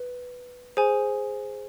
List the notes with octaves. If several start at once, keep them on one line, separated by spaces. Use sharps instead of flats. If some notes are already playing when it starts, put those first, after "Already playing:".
Already playing: B4
G#4 C5 G#5